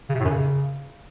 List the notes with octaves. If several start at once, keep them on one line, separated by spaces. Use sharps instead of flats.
C#3
C3
A2
F#2
C#3